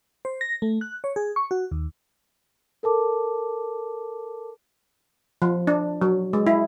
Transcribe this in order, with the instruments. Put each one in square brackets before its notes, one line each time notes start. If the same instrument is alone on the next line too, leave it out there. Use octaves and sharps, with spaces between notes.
[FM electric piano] C5
A#6
A3
F#6
C#5
G#4
C#6
F#4
D#2
[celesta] A4 A#4 A5 D6
[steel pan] F3
D4
F#3
G#3
E4